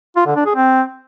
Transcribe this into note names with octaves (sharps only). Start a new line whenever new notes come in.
F4
D3
D4
G#4
C4